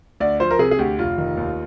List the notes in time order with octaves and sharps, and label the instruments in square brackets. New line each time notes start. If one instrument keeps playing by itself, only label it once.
[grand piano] D2 D5
F3 C5
A#4
C3 G#4
G#4
D2 G4
F1 F4
D#3
D#2